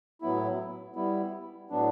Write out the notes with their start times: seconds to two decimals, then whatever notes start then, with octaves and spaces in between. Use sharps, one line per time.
0.22 A2 F#3 B3 E4
0.95 G3 B3 E4
1.70 A2 F#3 B3 D4